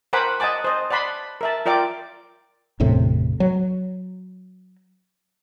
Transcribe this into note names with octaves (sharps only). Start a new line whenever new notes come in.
A#4 C5 F#5 G#5 B5 D6
D#5 F#5 G#5 A5 D6
C5 D#5
D5 F#5 A5 B5 C6
A#4 E5 A5
F4 A#4 D5 G5 D6
G1 E2 A2 C3
F#3